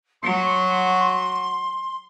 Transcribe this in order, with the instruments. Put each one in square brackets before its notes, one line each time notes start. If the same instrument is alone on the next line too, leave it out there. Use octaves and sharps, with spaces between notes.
[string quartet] F#3 F#4 [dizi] C6